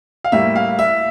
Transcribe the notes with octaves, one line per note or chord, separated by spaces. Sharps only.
F5
A2 G3 A#3 E5
F5
E5